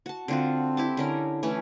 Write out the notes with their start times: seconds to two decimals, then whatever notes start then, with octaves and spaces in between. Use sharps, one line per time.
0.06 F#4 A5
0.28 D3 C4 F4 F#4
0.77 E4 G4 A5
0.97 D3 C#4 A#4
1.43 E3 A3 C#4